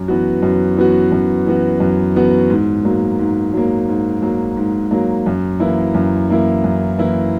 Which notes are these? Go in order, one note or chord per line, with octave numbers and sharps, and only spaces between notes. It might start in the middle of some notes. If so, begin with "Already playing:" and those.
Already playing: F#2
E3 B3 F#4
F#2
E3 B3 F#4
F#2
E3 B3 F#4
F#2
E3 B3 F#4
G#2
F#3 A#3
G#2
F#3 A#3
G#2
F#3 A#3
G#2
F#3 A#3
F#2
E3 A#3 E4
F#2
E3 A#3 E4
F#2
E3 A#3 E4